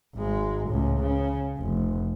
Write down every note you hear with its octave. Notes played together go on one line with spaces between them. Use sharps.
G#1 G#3
C#2 A2
C#3
F1